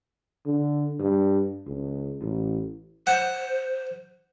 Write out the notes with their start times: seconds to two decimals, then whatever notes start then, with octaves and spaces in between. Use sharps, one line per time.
0.46 D3
1.00 G2
1.67 C#2
2.22 A1
3.07 C5 F#5